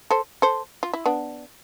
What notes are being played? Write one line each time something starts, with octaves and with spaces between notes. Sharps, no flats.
A4 C5
A4 C5
F4
E4
B3 D4